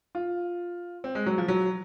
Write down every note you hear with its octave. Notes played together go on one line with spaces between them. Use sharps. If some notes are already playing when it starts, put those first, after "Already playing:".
F4
C4
G#3
F#3
F3
F#3